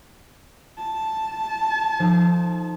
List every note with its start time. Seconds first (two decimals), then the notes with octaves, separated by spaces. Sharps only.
0.78 A5
1.99 F3 D#4 A4